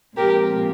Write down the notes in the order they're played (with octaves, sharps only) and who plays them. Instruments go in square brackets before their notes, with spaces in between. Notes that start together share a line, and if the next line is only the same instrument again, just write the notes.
[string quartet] A#2 F3 G#3 C4 G4 A#4